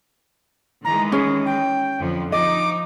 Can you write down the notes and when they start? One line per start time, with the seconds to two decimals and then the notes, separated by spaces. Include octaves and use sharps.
0.84 D#3 E3 G#3 A#5
1.12 C#4 G#4
1.45 G5
1.99 F2 D3 F3
2.32 F3 D#4 D#5 D6